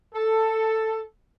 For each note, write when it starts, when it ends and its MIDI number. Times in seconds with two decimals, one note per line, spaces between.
0.14 0.99 69